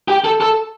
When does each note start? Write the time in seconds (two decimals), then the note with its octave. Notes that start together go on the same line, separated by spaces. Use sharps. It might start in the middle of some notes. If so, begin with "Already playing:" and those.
0.08 G4
0.24 A4
0.41 A4